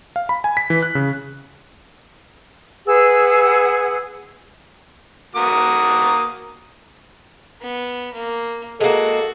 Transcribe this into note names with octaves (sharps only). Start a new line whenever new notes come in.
F5
B5
G#5
B6
E3
F#6
C#3
G#4 B4 F#5 E6
A#3 F#4 D#6
B3
A#3
G#3 A#3 F#4 A4